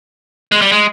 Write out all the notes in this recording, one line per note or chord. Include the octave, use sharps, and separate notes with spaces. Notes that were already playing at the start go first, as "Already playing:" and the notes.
G#3
G3
G#3